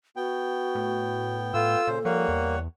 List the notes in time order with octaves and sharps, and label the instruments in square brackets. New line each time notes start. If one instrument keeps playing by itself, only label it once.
[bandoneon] B3 G5 [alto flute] F#4
[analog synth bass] A2
[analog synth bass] A2 [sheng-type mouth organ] F4 E6 [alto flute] A4
[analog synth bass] A#2 [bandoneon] C#3 C5
[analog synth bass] F3 [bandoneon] G3 C#5 F#5 [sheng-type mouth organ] A#3
[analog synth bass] E2